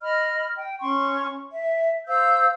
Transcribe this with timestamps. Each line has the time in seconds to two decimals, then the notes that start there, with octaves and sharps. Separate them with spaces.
0.02 D#5 B5 F6
0.56 G5
0.81 C#4 C6 C#6
1.52 E5
2.07 C5 F5 E6 G6